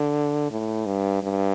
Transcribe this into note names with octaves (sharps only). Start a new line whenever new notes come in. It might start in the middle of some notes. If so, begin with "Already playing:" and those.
Already playing: D3
A2
G2
G2